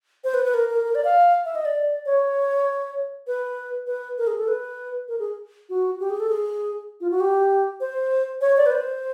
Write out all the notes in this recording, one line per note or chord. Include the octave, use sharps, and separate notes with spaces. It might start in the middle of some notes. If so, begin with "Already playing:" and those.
C5
B4
B4
A#4
A#4
A#4
D5
F5
E5
D#5
D5
C#5
B4
B4
A#4
G#4
A4
B4
A#4
G#4
F#4
G4
G#4
A4
G#4
F4
F#4
G4
C5
C#5
D5
B4
C5